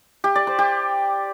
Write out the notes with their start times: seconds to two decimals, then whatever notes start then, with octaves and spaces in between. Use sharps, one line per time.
0.24 G4
0.35 D5
0.47 C5
0.59 G4